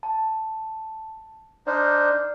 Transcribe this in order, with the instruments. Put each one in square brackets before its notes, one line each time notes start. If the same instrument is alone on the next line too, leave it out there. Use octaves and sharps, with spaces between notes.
[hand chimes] A5
[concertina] D4 D#4 C5 [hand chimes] D5 F6